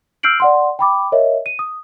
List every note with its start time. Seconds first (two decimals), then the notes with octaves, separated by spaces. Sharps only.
0.23 E6 F6 G6 C7 D7 F#7
0.40 D5 F#5 C6
0.79 G5 B5 D6
1.12 A#4 C#5 D#5 E5
1.46 D#7
1.59 D#6